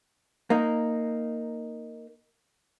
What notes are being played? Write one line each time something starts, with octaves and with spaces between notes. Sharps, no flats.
A#3 D#4